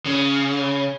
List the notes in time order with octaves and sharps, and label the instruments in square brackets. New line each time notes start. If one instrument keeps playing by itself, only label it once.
[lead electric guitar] C#3